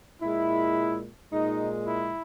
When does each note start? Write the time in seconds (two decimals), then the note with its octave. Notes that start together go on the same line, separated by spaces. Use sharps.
0.22 A#2 G#3 E4
1.32 A#2 G#3 D#4
1.86 E4